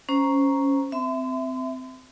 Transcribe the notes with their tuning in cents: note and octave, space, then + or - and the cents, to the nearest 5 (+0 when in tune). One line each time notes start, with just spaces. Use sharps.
C#4 +0 C5 +0 A#5 +5
C4 -20 E5 +0 C6 -40